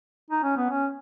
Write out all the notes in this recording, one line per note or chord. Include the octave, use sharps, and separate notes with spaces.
D#4
C#4
B3
C#4